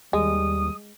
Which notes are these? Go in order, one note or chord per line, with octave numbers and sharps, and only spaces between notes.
D#2 G3 G#3 D#6